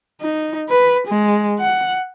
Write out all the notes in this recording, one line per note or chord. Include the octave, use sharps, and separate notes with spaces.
D#4
B4
G#3
F#5